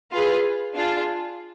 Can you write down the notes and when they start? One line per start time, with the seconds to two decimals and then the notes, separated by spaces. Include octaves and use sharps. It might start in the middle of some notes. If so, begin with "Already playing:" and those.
0.11 F4 G#4 B4
0.76 D4 F4 G#4